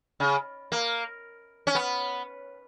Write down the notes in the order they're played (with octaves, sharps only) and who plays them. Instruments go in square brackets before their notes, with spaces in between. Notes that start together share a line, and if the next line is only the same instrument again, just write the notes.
[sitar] C#3
A#3
C#4
B3